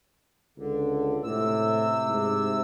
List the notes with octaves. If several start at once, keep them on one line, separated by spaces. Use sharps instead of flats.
C#2 D3
A2 C3 E6
G#2